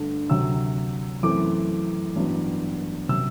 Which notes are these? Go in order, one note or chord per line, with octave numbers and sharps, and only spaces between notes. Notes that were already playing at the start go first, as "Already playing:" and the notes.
Already playing: G2 D3 A3 D4
D2 C3 F#3 E6
F#2 E3 A3 C4 D6
A1 G2 F#3 B3
C3 F#3 E6